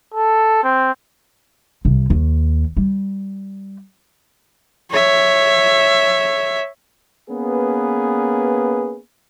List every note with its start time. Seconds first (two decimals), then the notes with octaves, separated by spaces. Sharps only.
0.14 A4
0.64 C4
1.85 C2
2.10 D#2
2.77 G3
4.91 C#5 E5
7.30 A#3 B3 C#4 G#4 B4